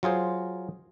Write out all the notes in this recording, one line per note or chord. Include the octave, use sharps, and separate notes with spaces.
F#3 F4 G#4 C5